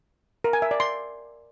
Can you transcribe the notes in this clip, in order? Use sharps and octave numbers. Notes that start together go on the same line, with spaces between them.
A#4
G#5
E5
D5
C6